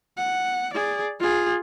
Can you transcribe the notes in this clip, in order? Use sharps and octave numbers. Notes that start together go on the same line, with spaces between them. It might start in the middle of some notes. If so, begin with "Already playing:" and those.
F#5
G#4 D5
F4 G#4